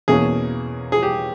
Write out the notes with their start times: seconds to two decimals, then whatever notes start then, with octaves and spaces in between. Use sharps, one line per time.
0.08 E2 B2 A#3 C#4 G#4
0.92 G#4
1.03 G4